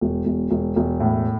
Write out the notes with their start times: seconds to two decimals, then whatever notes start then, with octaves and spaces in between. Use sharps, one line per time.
0.01 E1
0.25 E1
0.51 E1
0.76 E1
1.00 A2